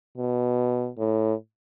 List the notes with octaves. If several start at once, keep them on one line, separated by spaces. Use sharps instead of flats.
B2
A2